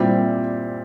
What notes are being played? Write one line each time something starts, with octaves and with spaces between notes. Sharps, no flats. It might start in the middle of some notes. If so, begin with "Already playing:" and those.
Already playing: A#2 G3 C4 E4